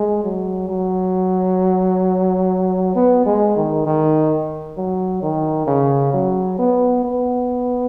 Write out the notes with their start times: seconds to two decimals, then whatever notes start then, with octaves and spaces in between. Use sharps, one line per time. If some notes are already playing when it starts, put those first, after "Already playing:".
Already playing: G#3
0.24 F#3
0.69 F#3
2.95 B3
3.26 G#3
3.56 D#3
3.86 D#3
4.77 F#3
5.22 D#3
5.67 C#3
6.13 F#3
6.59 B3
7.04 B3